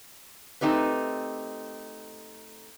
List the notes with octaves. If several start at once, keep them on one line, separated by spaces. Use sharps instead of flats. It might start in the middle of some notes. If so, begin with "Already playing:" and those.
A3 C4 D#4 G4 B4